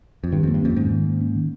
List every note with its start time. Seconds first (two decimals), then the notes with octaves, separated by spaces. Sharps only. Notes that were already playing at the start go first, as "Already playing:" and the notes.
0.24 F2
0.32 G2 D#3
0.43 F2
0.47 A#3
0.54 G2
0.62 F2 C#4
0.76 G#2 D#3
0.91 D#3
1.06 A#3
1.21 C#4
1.35 D#3